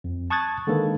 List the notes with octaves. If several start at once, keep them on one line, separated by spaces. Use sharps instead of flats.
F2
A5 C#6 D#6 F#6 G#6 A6
D3 D#3 G#3 A#3 A4 B4